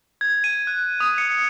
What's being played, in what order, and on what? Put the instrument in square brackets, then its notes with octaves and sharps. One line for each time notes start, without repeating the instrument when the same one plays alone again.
[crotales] G#6
D#7
F#6
D#6
C#7